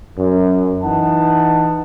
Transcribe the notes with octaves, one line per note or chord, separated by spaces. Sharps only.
F#2
E3 D#4 F#5 A5